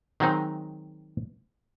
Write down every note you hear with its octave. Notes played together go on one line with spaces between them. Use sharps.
D#3 F#3 G#3 C4 D#4